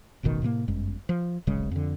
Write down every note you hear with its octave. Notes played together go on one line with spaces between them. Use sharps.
E1 A1 B2 D#3
A2 C3 A3 A#3
G1 F#2 G#3
F3
D1 G#1 C#3 G#3
F2 D3